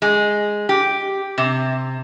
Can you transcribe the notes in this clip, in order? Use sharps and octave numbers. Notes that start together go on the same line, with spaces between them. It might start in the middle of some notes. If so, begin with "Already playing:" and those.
G#3
G4
C3